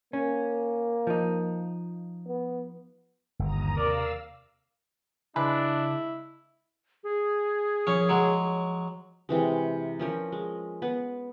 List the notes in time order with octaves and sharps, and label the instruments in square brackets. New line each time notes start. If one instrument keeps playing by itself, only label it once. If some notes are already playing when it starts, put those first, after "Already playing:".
[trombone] A#3 [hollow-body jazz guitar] C#4
[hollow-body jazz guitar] F3 D#4
[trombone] B3
[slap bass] G1 [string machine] D#2 A#5 D#6
[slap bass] C3 [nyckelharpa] A#4 D5 [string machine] F5 E6
[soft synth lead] C#3 [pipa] G#3 B4 [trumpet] D4 [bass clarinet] E4
[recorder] G#4
[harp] F3 C#5 [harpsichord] C#4
[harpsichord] F#3 G#3
[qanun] C3 E3 G#3
F3 C#4 A#4
G#3
B3